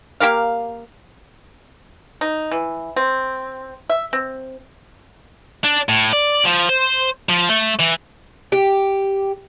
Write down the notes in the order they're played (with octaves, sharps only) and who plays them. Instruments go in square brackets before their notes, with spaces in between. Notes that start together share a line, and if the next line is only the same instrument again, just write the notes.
[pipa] A#3 G4 A#4 F5
D#4
E3
C4
E5
C4
[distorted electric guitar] D4
A2
D5
F3
C5
F3
A3
E3
[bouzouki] G4